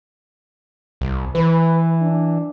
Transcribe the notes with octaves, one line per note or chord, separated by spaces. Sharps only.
C2
E3 B4
D4